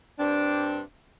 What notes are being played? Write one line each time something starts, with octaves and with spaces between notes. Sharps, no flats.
G2 C4 D4